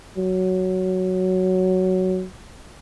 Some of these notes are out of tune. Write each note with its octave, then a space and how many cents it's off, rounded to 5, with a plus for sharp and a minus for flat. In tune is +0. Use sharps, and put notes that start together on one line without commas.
F#3 +5